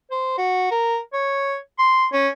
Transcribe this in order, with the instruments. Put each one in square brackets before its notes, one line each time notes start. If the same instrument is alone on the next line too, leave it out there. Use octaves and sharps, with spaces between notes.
[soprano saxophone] C5
F#4
A#4
C#5
C6
C#4